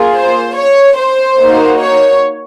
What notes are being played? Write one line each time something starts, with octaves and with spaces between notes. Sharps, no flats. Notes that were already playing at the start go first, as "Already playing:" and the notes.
Already playing: A#3 F4 G#4
C5
C#5
C5
A#3 D#4 F#4
C#5